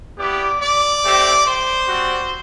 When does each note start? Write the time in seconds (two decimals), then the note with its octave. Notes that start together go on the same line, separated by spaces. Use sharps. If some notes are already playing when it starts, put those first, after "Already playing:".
0.18 B3 E4 G4 D5
0.60 D5
1.03 A3 C4 G4
1.45 C5
1.87 G3 C4 F#4